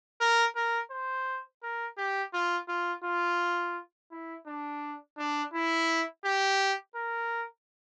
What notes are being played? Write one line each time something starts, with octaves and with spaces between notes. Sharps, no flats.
A#4
A#4
C5
A#4
G4
F4
F4
F4
E4
D4
D4
E4
G4
A#4